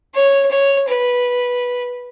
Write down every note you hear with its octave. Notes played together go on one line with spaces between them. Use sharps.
C#5
C#5
B4